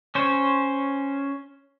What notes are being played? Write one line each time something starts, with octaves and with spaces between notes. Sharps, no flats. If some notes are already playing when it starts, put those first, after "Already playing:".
C#4 C5